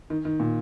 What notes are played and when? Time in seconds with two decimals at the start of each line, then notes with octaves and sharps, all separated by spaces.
0.10 D#3
0.25 D#3
0.40 A#2